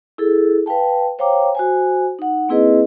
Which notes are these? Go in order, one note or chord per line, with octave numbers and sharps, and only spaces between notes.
E4 G#4 A4
B4 F5 G5 A5
C5 C#5 F5 G5 A#5 D6
F#4 C5 G#5
D#4 F#5
A#3 C4 E4 G#4 B4 D#5